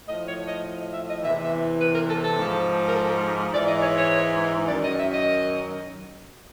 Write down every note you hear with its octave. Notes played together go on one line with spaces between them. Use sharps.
A2 F3 D#5
C#5
D#5
D#5
E5
D#5
E2 C3 E3 E5
E5
B4
A#4
A4
A4
G#2 F3
A#4
A4
G#2 E3 D5
D#5
C#5
C#5
F#2 D#3 F#3 D5
D#5
E5
D#5